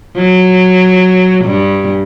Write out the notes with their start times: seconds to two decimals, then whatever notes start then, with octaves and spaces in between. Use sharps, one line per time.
0.16 F#3
1.45 G2